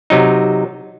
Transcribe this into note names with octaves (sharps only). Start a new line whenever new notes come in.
C3 F#3 D#4